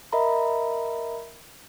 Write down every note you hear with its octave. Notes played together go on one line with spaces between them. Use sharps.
A#4 D#5 E5 A#5 B5